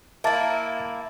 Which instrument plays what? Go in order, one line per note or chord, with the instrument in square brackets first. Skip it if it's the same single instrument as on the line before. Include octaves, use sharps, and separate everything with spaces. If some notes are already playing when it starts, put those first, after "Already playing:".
[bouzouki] A#3 E4 [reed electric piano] E5 A5 A6